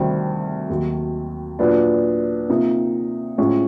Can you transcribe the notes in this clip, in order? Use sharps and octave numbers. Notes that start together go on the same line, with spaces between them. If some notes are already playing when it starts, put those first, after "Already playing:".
Already playing: D2 C3 D#3 G3 C4
D#2 D#3 F#3
A#2 F#3 B3 D4
C3 F3 A#3 D#4
A2 F3 G#3 C#4